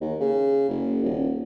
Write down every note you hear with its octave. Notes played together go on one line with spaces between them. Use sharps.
D#2
C#3
F#1
D#1